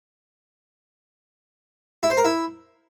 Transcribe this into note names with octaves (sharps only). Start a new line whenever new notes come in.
E4
C5
A#4
E4